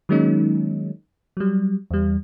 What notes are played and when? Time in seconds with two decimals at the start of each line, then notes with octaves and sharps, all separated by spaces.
0.09 D#3 F#3 G#3 A#3 C#4 D#4
1.37 F#3 G3
1.91 E2 G3